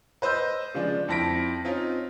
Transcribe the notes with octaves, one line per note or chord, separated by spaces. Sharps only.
B4 C5 D#5 E6 G6
C#3 F3 G#3 D4
F2 E4 A5 A#6 B6 D7
C4 C#4 D#4 F4